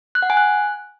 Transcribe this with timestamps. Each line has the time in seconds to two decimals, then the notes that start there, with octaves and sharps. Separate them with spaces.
0.15 F#6
0.22 F#5
0.30 G#5
0.37 F#6